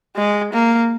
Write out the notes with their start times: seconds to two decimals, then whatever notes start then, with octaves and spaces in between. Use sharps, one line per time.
0.17 G#3
0.53 A#3